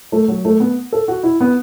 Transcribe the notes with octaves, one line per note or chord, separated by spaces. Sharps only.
A3
F#3
A3
B3
A4
F#4
E4
B3